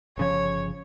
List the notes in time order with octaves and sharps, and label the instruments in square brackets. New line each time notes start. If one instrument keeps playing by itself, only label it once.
[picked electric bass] G1 C#3 F3 [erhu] C#5